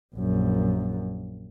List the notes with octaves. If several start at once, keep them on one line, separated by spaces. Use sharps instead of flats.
A#1 F#2